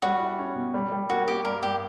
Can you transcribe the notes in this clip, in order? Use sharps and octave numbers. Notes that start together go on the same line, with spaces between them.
G3 F#4
E4
C#4
B2
G3
G3
A#3 F#4
A#3 G4
G2 A#4
G2 G4